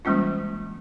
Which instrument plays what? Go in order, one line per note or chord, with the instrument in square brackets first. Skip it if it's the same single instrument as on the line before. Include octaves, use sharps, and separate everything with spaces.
[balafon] E3 G3 G#3 A#3 C#4 F4